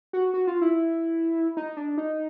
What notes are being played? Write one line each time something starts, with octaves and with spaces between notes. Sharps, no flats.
F#4
F#4
F4
E4
D#4
D4
D#4